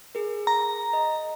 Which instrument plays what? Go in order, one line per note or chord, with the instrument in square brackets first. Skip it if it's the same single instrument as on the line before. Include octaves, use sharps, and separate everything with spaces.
[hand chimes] G#4 A#4
[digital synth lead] A#5
[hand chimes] D#5